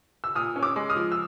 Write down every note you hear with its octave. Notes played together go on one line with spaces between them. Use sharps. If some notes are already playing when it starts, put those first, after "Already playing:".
E6
A#2 D#6 F6
C#4
D6 E6
G#3
D#6 F6
F3
E6